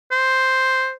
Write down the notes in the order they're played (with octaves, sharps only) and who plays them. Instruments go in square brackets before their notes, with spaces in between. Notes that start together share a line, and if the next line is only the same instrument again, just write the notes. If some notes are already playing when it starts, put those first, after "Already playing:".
[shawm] C5